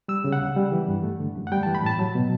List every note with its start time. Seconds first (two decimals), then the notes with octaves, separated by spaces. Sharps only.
0.08 G3 E6
0.24 C#3
0.33 F#5
0.40 D2
0.56 G3
0.72 E3
0.88 G2
1.03 A3
1.20 D3
1.36 F#2
1.47 F#5
1.52 G3 G5
1.63 A5
1.67 E3
1.75 B5
1.83 A2 A5
1.99 F#3
2.15 B2